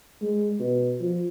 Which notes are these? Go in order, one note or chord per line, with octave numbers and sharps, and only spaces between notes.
G#3
B2
F3